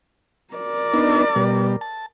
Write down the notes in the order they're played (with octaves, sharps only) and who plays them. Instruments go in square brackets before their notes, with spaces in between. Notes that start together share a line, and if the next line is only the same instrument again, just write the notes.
[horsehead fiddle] A#4 D5
[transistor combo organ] B3 D4 D#4
B2 G3
A5